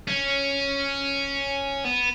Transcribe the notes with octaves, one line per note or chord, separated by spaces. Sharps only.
C#4
B3